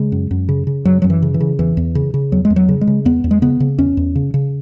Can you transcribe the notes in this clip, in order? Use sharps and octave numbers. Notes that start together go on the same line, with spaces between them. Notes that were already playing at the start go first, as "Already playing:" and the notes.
Already playing: C#3 G#3
F#2
F#2
C#3
C#3
F#2 F#3
F#2 F#3
E3
C#3
E3
C#3
E2 E3
E2
C#3
C#3
E2 F#3
G#3
E2
F#3
C#3
G#3
C#3
E2 B3
E2
G#3
C#3 B3
C#3
E2 C#4
E2
C#3
C#3